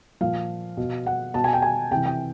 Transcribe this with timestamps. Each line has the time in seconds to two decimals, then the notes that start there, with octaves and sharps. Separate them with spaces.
0.21 A#2 F3 F5
0.77 B2
1.06 F#5
1.34 B2 A5
1.44 G#5
1.53 G5
1.62 G#5
1.91 C3 E3 G5
2.06 G5